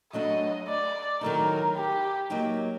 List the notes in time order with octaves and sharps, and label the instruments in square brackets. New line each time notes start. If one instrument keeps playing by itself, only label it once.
[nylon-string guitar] F#3 A3 D4 F#4 [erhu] D#5
[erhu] D5
[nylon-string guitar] D#3 F#3 A3 D#4 [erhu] A#4
[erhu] G4
[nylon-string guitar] F#3 A#3 D#4 G4